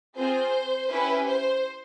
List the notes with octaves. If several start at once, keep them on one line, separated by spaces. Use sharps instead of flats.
C4 F4 G#4 C5
C#4 E4 G4 B4
C5